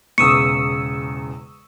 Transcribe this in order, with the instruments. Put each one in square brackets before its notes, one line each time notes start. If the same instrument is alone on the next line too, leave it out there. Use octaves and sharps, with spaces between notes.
[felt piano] E1 E2 C#3 [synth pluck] C#6 D#6 E6 [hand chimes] C#7